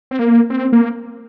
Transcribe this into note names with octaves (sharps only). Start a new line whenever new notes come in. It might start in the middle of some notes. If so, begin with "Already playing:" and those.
C4
A#3
C4
A#3